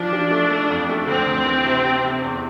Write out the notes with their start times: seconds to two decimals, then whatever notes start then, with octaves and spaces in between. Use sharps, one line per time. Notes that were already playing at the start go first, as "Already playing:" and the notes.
Already playing: F3 D4
0.13 F3
0.31 A3
0.50 A3
0.70 F2
0.89 A3
1.07 D2 C4
1.27 D2
1.46 E3
1.65 C3
1.84 C3
2.04 C3
2.22 E2